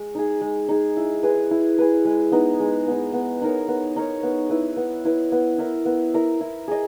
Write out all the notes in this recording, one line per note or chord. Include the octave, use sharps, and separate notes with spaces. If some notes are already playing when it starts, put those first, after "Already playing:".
Already playing: G#3
D#4 G#4
G#3
D#4 G#4
E4
G#4 B4
E4
G#4 B4
G#3
B3 D#4
G#3
B3 D#4
B3
D#4 A#4 C#5
B3
D#4 A#4 C#5
B3
E4 B4
B3
E4 B4
B3
E4 A#4 E5
B3
E4 A#4 E5
E4
G#4 D#5